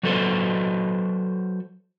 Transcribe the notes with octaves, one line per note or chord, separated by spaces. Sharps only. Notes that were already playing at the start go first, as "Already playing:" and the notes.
F#3 F#4 A4 B4 C5